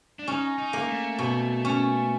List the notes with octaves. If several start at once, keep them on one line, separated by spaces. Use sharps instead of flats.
D4
C#4 D#4
D#4
A#3
A3
B2
C#4